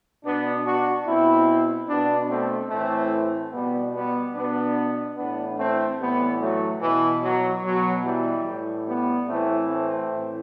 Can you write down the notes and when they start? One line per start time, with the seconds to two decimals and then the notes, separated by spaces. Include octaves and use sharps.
0.24 B2 B3 D4
0.65 D4 F#4
1.06 B2 C4 E4
1.88 B2 B3 D4
2.29 A3 C4
2.70 A2 E3 A3 C4
3.52 B2 G3 B3
3.94 G3 B3
4.35 B2 B3 D4
5.17 A2 E3 B3 D4
5.58 A3 C4
5.99 A2 E3 G3 B3
6.40 F#3 A3
6.81 B2 E3
7.23 F#3
7.63 B2 F#3
8.04 E3 G3
8.46 A2 E3
8.87 G3 B3
9.28 A2 E3 A3 C4
9.69 A3 C4
10.10 A2 E3